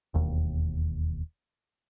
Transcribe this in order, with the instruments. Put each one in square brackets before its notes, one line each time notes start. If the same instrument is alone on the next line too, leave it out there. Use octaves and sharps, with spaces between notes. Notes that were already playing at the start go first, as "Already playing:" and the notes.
[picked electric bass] E1 D#2